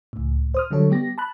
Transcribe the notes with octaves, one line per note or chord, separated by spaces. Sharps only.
C#2 A2
C5 D#6 F6
D3 F#3 G3 A4 C#5
G3 B3 G4 A#6
A5 B5 F#6